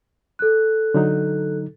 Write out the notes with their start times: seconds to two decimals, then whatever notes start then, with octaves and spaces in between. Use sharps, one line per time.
0.39 A4 F#6
0.94 D3 F#3 D#4